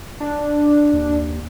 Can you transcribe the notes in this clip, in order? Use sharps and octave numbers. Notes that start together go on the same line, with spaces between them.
D4
D#2